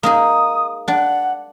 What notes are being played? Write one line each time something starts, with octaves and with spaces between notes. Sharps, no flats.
A#3 D#4 G#4 D#6
D4 D5 F#5